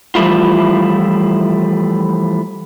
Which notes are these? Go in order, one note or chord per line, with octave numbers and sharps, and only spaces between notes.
E3 F3 G3 A3 E4 F4